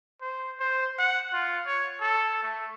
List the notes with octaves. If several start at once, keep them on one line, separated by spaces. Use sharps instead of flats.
C5
C5
F#5
F4
C#5
A4
A3